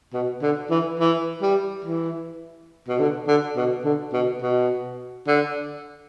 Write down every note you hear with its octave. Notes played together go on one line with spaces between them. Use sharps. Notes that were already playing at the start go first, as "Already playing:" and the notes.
B2
D3
E3
E3
G3
E3
B2
D3
D3
B2
D3
B2
B2
D3